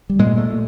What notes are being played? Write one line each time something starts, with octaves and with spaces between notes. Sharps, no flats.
G3
A#2 G#3
A3